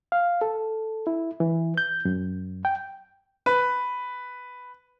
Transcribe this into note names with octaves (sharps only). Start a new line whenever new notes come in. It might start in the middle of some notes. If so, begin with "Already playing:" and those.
F5
A4
E4
E3
G6
F#2
G5
B4